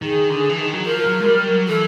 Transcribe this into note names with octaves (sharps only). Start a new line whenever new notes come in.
D#3 G#4
D3
E3
D#3
F#3
F3 A#4
F#3
G#3
G3
F#3
E3 A4